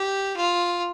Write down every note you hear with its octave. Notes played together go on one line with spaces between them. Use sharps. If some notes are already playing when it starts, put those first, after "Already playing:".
Already playing: G4
F4